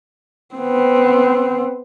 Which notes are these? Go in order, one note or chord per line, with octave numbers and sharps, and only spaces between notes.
B3 C4